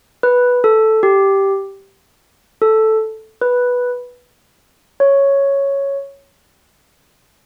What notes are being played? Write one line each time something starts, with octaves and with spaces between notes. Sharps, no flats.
B4
A4
G4
A4
B4
C#5